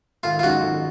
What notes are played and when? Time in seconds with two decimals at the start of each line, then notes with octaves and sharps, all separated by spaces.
0.23 G#1 F4
0.39 F4
0.43 F#2 F3 G#3 D#4 F#4
0.63 G#1